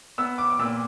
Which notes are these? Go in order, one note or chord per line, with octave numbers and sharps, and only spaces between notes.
B3 E6
D6
D6
A#2 E6